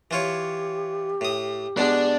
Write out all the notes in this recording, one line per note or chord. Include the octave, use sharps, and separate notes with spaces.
E3 F4 G4 C#5
A2 D#6
B2 G#3 D4